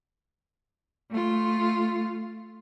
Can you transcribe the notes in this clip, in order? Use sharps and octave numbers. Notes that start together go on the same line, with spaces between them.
A3 F4